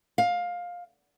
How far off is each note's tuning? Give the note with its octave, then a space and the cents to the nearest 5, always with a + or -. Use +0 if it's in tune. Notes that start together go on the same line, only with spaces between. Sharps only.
F5 +15